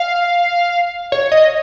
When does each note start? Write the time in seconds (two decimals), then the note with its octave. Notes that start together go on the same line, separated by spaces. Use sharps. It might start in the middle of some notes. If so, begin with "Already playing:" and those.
Already playing: F5
1.12 C#5
1.32 D#5